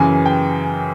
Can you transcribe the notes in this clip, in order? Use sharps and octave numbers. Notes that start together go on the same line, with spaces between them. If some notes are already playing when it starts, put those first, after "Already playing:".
Already playing: F#2 C#3 E3 G#5
G5